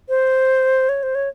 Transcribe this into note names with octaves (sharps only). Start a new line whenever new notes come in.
C5
C#5
C5
C#5